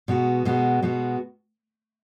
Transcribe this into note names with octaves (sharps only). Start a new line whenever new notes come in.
B2 G#3 B3 F#4
B2 G#3 B3 F#4
B2 G#3 B3 F#4